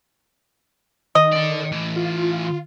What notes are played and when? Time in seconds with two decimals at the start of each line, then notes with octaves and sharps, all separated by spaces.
1.15 D#3 D#5
1.32 A4 D5
1.72 A2 E3
1.96 F4